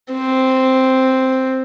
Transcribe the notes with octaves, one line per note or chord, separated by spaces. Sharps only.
C4